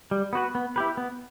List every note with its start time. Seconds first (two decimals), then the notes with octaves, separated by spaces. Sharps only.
0.11 G3
0.33 B3 F#4 B4
0.55 B3
0.76 E4 G4 B4
0.97 B3